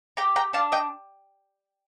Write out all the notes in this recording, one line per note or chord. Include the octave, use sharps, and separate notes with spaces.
G4 G5 A#5
G5 A#5
D4 F5 A5
D#5 G5